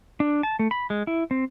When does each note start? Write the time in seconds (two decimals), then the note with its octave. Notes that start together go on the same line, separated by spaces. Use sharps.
0.20 D4
0.43 A5
0.59 A3
0.71 B5
0.90 G#3
1.07 E4
1.31 C4